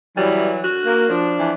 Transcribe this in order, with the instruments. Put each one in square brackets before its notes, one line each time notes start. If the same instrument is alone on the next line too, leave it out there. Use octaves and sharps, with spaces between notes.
[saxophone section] E3 F#3 [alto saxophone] G3
[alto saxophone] F#4
[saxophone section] A#3
F3 D4
[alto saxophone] E3